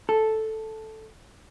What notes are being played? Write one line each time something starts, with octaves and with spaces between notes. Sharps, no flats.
A4